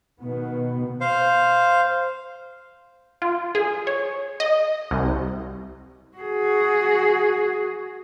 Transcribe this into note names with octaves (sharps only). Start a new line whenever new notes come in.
B2 D#3 B3
C5 F5
F4
G#4
C#5
D#5
C2
F#4 G#4